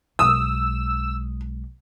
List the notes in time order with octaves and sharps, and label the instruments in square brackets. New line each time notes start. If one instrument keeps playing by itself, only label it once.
[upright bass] B1 G#3 [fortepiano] D#6 [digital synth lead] E6